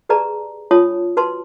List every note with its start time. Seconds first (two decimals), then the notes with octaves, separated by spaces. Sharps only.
0.09 G4 G#4 B4 D5 A5 A#5
0.71 D4 F4 C#5 A5 D#6
1.17 F#4 B4 A5 C6